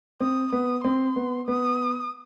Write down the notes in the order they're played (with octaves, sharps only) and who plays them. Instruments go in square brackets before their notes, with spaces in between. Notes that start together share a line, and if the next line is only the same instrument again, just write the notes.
[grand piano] C4 [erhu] D#6
[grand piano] B3 [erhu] D#6
[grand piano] C4 [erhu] C6
[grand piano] B3
[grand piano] B3 [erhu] D#6